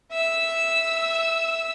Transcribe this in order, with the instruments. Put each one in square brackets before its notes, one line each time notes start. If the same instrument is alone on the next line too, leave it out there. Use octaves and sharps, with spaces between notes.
[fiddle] E5 E6